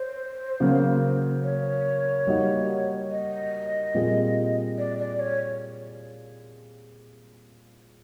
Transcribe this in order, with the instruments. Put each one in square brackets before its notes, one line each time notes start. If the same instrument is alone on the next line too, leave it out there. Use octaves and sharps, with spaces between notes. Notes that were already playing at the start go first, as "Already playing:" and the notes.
Already playing: [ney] C5 [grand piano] C#5
[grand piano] C#3 F#3 A#3 C#4
[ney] C#5
[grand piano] G3 A#3 D#4 F#4
[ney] D#5
[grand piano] A#2 G3 C4 F4 G#4
[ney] D5
D5
C#5